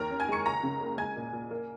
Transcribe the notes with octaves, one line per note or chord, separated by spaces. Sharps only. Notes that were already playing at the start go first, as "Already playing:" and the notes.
Already playing: D#2 A#4 A#5
C#4
G#5 G#6
G#3 C#6 C#7
C#2 A#5 A#6
C#3
A#3
G#3 G#5 G#6
A#2
A#2
A#3